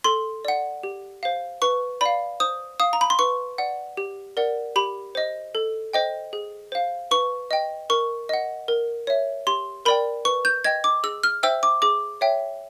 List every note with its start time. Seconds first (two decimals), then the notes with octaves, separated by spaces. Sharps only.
0.04 A4 C6
0.45 D5 F#5
0.83 G4
1.23 C5 F5
1.62 B4 C#6
2.01 D5 F5 B5
2.40 C5 D#6
2.80 F5 D#6
2.93 A#5
3.01 B5
3.10 C6
3.19 B4 C#6
3.58 D5 F#5
3.97 G4
4.37 A#4 D5 F#5
4.76 G4 B5
5.15 C5 D#5
5.55 A4
5.93 C5 D#5 G5
6.33 G#4
6.72 C5 F5
7.11 B4 C#6
7.51 D#5 G5
7.90 A#4 C#6
8.29 D#5 F#5
8.68 A#4
9.07 C#5 E5
9.47 G4 C6
9.85 A#4 D5 G5 B5
10.25 B4 C#6
10.45 G6
10.64 D#5 G5 G#6
10.84 D6
11.03 G#4 E6
11.23 F6
11.43 C5 E5 G5 E6
11.63 D6
11.82 G#4 D6
12.21 C#5 E5 G5